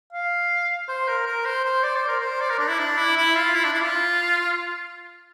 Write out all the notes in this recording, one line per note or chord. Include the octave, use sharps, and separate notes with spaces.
F5
C5
A#4
A#4
C5
C5
D5
C5
A#4
C5
D5
A#4
D4
E4
D4
E4
E4
F4
E4
D4
E4
F4